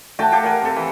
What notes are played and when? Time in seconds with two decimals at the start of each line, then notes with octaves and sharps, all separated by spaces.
0.19 A3 F#4 G5 A5
0.32 G4 A4 F5 G5
0.43 A#4 F5 F#5 G#5
0.63 C3 A4
0.77 E3